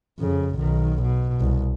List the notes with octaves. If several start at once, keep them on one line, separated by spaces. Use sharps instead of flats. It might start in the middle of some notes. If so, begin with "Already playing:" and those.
F2 C#3
B1 D#3
B2
C2